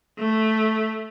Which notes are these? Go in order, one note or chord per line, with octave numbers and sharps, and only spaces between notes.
A3